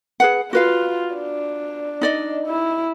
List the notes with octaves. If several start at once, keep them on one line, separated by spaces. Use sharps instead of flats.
G#4 B4 F#5
F4 F#4 B4 F5
D4
D#4 D5 D#5
E4